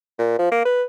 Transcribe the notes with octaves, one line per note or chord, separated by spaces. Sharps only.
A#2
F3
A#3
B4